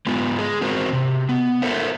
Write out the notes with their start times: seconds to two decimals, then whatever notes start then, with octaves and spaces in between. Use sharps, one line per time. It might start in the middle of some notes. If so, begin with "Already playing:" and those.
0.07 G#3 B3 F4
0.39 G#3 G#4
0.61 C4 F#4 A#4 C5
0.93 C3
1.29 B3
1.62 F4 A4 A#4 C5 E5 F#5